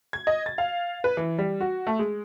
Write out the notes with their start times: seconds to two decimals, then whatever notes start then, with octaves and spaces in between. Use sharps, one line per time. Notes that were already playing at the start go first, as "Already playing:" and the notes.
0.13 G#6
0.27 D#5
0.46 A6
0.58 F5
1.04 B4
1.17 E3
1.38 G3
1.61 F#4
1.87 A3
1.99 G#3